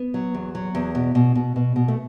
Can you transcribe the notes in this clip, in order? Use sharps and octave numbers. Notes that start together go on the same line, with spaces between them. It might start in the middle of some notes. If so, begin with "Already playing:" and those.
Already playing: B3
F#3
E2
F#3
E2
B2
B2
B2
B2
B2
A3